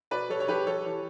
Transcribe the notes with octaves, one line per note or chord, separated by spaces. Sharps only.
B2 B4 D5
G3 A4 C#5
C#5
G3 G4 B4
G3 A4 C#5
E3